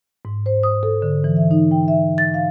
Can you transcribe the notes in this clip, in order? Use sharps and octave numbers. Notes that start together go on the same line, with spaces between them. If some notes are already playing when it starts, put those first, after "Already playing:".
G#2
C5
D#6
A4
D3
E3
E5
D#4
G5
E5
A6
F5